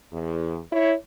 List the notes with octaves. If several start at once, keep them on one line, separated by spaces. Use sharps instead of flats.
E2
E4 C#5